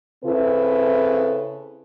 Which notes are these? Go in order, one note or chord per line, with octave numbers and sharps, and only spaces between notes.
C#3 C4 E4 A4 B4